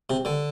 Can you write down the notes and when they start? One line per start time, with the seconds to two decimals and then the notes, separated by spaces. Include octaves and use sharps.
0.10 C3
0.25 D3